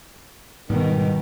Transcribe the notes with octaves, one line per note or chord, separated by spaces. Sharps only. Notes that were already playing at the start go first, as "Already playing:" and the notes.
G#2 B2 D#3 G3